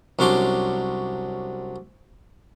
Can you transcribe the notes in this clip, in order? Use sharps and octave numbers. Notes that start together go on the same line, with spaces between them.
C2 F#3 C#4 D4 C6 D6